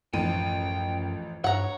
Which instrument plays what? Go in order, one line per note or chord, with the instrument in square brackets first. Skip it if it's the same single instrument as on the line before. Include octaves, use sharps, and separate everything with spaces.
[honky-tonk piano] A1 F3 D#7 [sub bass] F#2 [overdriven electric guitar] G5
[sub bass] G2 [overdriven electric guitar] C#5 [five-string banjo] F#5 A#5